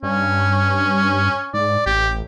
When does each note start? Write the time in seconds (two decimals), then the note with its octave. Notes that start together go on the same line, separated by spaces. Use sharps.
0.03 G2 C#4
1.54 G#2 D5
1.86 A1 G4